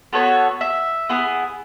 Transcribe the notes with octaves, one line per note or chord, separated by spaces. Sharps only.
B3 F#4 A4 C#5
E5
B3 E4 G#4